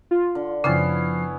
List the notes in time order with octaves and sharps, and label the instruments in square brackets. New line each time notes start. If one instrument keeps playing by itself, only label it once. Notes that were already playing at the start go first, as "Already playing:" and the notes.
[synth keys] F4
[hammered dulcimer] D3
[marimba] F#2 C#3 [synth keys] F3 C7 [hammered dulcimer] B3 C#4 E4